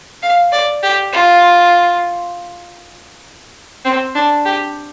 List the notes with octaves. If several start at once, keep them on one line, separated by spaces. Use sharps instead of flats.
F5
D5
G4
F4
C4
D4
G4